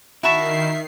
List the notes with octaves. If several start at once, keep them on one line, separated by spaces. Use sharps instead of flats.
D#3 E4 F#4 E5 A5 B5 C#6 C7